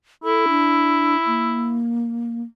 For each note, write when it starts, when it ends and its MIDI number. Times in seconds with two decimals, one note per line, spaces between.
0.24 1.81 64
0.24 0.46 69
0.49 1.16 62
1.26 2.42 58